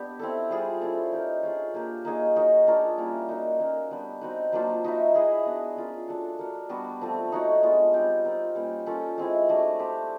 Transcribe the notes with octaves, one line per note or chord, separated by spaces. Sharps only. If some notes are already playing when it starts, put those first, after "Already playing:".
Already playing: B3 D4 G4
C4 E4 A4
G3 C4 F4 G#4
C#4 E4 A4 D5
D#4 G4 A#4
D4 F4 G#4 C#5
A#3 D4 G4 A#4
A#3 D#4 G#4 C#5
D#4 F#4 A#4
D4 F4 A#4 C#5
G3 A#3 C#4 E4
D#4 F#4 A#4
A#3 C#4 F#4 A#4
G3 B3 D4
C4 D#4 F#4 B4
F#3 A#3 D4 F4
D#4 F#4 B4 E5
E4 G#4 B4 D#5
B3 D4 F#4
C#4 F4 A#4
A3 D4 F#4 A4
D4 F#4 A#4
G3 B3 D4 F#4
F3 A3 C4
D#4 F#4 A4 C#5
G#3 B3 D4 F4
G3 C4 D#4 G4
C4 F4 A#4
G3 A#3 C#4
C#4 F4 A4
G#3 C4 E4
A3 D4 F#4
D4 G4 C5